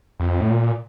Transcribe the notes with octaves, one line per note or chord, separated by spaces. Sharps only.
F2
A2
A#2